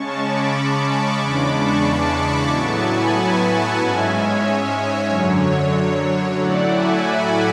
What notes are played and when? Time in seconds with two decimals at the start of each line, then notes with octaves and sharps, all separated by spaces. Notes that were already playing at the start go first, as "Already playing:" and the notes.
Already playing: C#3 G#3 C#4 A5 C#6
0.21 B5 D6
0.86 A5 C#6
1.18 E2 C#3 G#3 D4 B5 D6
1.51 A5 C#6
1.83 A5 C#6
2.16 B5 D6
2.48 A2 F#3 B3 E4 A5 C#6
2.81 G#5 B5
3.13 G#5 B5
3.45 F#5 A5
3.78 G#2 G#3 C#4 E5 G#5
4.11 C#5 E5
4.43 C#5 E5
4.75 C#5
5.07 F#2 D3 F#3
5.40 C#5
6.37 A2 F#3 A3 E4 D5 F#5
6.69 E5 G#5
7.03 G#5 B5